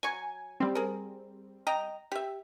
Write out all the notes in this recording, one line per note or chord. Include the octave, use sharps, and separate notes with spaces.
F#3 G#5 C#6
G3 C4
G#4 A#4
D#5 G5 A#5
G4 E5